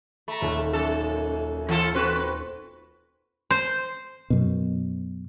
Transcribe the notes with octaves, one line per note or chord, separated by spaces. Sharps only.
A3 A#5 B5
D#1 D#2 A5
F#2 A4
E3 F4 A4
C4 F#4 B4 C5
C5
F#2 B2